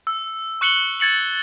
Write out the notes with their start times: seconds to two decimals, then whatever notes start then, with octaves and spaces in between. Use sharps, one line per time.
0.07 E6
0.61 C#6 F#6 C#7 F#7 G7
1.00 G#6 A6 C#7 F#7